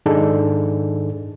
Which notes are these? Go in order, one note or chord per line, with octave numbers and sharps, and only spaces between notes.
G#2 D#3 D4 D#4 G#4 A4